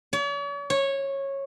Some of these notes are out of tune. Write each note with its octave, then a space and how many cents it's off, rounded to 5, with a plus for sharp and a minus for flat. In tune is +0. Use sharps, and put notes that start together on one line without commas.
C#5 +45
C#5 -15